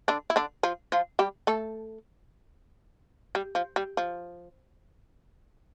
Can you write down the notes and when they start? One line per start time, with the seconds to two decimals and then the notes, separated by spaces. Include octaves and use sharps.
0.08 D3 D4
0.30 E4
0.36 D3 D4
0.63 F3 F4
0.92 F3 F4
1.19 G3 G4
1.47 A3 A4
3.35 G3
3.55 F3
3.76 G3
3.97 F3